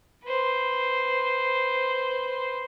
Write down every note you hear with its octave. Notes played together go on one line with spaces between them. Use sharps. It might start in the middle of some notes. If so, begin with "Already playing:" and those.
B4 C5